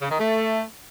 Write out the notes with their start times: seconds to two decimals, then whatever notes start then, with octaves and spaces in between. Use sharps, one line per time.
0.02 C#3
0.11 D#3
0.20 A3